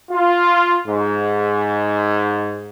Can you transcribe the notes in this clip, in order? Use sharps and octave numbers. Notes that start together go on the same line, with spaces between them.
F4
G#2